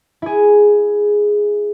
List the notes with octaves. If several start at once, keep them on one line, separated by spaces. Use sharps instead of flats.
E4 G#4